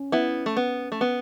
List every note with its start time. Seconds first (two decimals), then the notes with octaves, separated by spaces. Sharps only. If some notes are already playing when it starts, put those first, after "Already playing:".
Already playing: C#4
0.12 B3 E4
0.46 A3
0.57 B3
0.92 A3
1.01 B3